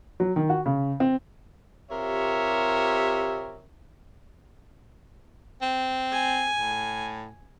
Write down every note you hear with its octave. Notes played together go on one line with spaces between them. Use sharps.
F#3
D#3
F#4
C#3
C4
C3 F4 G4 A#4 C#5 E5
C4
G#5
A2